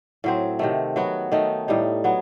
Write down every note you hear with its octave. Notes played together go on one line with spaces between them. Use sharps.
A2 F#3 C4
C3 D#3 A3
F#3 B3 F#4
D#3 A3 D#4
A2 G3 D#4
F#3 B3